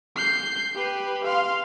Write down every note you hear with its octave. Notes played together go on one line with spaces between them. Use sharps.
G6 C7
G4 B4
F5 C6